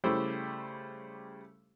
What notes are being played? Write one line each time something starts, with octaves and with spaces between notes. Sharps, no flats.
C#3 G3 A3 E4 G4 C5